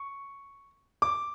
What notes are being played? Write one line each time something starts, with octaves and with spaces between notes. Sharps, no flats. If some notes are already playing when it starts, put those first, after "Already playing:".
Already playing: C#6
D6